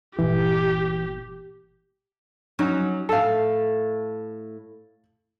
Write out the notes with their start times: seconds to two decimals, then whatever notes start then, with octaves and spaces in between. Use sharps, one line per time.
0.19 G1 A#2 E3 G4
2.59 F#3 C#4 D#4
3.09 A2 A3 A4 F5